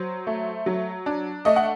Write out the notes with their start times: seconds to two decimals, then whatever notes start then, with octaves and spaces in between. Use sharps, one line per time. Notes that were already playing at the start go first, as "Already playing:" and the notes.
Already playing: F#3 C5
0.27 A3
0.66 F#3
1.06 D4
1.45 A3 D#5
1.56 F#5